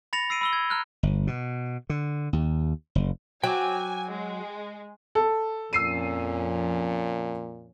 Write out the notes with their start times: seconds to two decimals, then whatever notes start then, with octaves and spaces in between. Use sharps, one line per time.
0.13 B5 A6 A#6 C#7 F7
0.29 B5 E6 C7 D7 D#7 F7
0.41 B5 E6 G7
0.53 G#6
0.70 A#5 F6 F#6
1.03 G1
1.27 B2
1.90 D3
2.33 D#2
2.95 F#1
3.44 F#3 G5 G#5 D6
4.10 G#3
5.15 A4
5.73 F2 A#2 F3 C#4 E6 C7 D#7